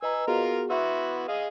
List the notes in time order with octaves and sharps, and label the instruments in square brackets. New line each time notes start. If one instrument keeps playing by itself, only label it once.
[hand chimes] B4 D#5 A#5 [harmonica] G#5 E6
[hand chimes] B3 F#4 G#4 [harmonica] F4 A#4
[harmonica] B3 E4 F#4 [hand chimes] E5 C6 E6
[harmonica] G#4 D#5 F5